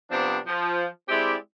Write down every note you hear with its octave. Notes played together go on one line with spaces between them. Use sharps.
C3 F3 B3 C4 D4
F3
G#3 C4 E4 G4 D5 E5